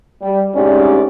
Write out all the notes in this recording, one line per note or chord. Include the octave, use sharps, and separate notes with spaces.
G3
D2 G#2 C3 C#4 G4 D5